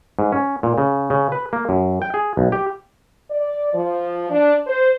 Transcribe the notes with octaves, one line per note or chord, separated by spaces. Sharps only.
G#2
C#4
A#2
C#3
C#3
B4
A#3
F#2
G5
G#4
B1
G4
D5
F3
D4
C5